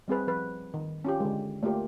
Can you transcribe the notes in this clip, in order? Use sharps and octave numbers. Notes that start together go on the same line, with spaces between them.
G3 C4 G#4 B4
F3 B4
D#3
C#4 F4 G4
D3 G#3
A3 A#3 F4 G4 A#4